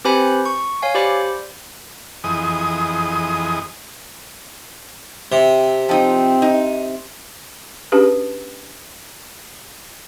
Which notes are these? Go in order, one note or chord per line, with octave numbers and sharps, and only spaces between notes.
C4 G4 B4 C5 G#5 B5
C#6
C#5 F5 G#5
G4 C5 D5 B5 D6
F2 E3 G#4 D#5 D#6
C3 C4
F3 C4 D#4
D#4
C#4 D4 G4 G#4 B4